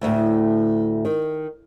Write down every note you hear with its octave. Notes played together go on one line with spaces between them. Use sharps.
D2 A2
D#3